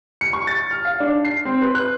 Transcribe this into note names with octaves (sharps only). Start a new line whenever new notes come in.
C#7
C#6
A6
F6
F5
D4
C7
C4
B4
F#6